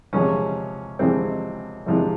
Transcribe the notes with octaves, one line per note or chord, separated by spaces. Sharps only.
E2 C3 F3 G#3 C#4
E2 C3 F3 G#3 C4
E2 C3 F3 G#3